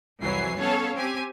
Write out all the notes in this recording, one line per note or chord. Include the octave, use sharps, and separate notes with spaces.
C2 F2 E3 F#3 G#5 C7
B3 C#4 A4 C#5 F5 A5
C4 G4 G#5